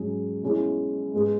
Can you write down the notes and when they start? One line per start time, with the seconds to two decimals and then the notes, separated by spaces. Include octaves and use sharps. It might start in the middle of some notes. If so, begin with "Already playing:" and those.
Already playing: G#2 F#3 C#4 G#4
0.43 B2 G#3 C#4 E4
1.13 G#2 G#3 B3